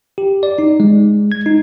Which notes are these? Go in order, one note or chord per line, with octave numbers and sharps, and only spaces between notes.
G4
D5
D#4
G#3
G#6
D#4